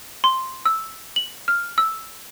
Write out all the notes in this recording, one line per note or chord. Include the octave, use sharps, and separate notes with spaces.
C6
E6
F#7
F6
E6